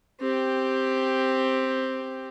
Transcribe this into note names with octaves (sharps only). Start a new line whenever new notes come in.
C4 G4